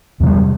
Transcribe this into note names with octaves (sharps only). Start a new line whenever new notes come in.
E2 C3 G3